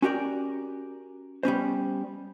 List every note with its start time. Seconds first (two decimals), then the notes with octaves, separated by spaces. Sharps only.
0.02 C#4 F#4 G4 A#4 D5
1.43 G3 B3 C#4 C5